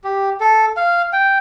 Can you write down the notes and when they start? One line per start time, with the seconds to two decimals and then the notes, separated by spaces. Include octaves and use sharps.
0.04 G4
0.40 A4
0.77 F5
1.13 G5